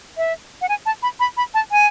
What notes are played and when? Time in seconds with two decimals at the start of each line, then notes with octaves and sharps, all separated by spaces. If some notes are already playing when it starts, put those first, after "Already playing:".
0.17 E5
0.61 F#5
0.69 G#5
0.86 A5
1.03 B5
1.20 B5
1.37 B5
1.54 A5
1.72 G#5